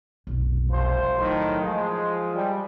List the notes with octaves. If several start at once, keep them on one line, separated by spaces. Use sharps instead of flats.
F1 B1
C2 F3 C5
A2 D#3 F#3
F3 G#3
G3